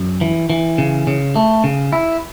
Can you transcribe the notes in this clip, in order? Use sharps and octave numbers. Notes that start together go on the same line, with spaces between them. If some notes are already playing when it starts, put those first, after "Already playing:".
Already playing: F#2
E3
E3
C#3
C#3
A3
C#3
E4